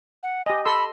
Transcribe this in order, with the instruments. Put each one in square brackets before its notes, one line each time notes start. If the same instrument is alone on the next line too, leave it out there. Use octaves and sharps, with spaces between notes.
[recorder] F#5
[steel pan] G4 D#5 [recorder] G#5
[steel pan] A4 C6 E6 [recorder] B5